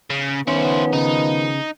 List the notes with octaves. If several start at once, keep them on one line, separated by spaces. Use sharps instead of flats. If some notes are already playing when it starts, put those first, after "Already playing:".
C#3
D#3 F3 B3 C#4 E4 C5
C#3 D#4